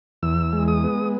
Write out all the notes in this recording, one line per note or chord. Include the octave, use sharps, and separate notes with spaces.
E2 E6
G#3
D#6
B3